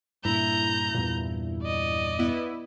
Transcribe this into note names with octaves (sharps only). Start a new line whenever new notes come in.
G2 A#2 E4 A#5 G6
E2 G2 A#2
D5 D#5
B3 E4